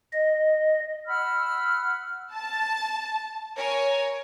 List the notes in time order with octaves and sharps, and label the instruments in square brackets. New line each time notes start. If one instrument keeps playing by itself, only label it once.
[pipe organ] D#5
[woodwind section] F#5 B5 E6 F6
[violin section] A5
A#4 C#5 G#5